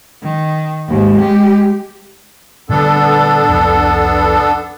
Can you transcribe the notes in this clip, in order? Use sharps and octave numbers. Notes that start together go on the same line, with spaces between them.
D#3
D#2 G#2
G#3 G4
A#2 D3 G3 B3 D4 A4
C2 F2